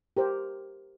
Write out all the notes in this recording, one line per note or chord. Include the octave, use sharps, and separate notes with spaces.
G4 A#4 C5